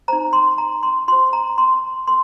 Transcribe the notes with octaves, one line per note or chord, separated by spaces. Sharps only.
D#4 C5 A#5
C6
A#5
C6
F4 C5 C6
A#5
C6
A#4 C6